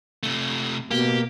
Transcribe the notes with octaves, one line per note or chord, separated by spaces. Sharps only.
C3 A3
B2 A#3 G4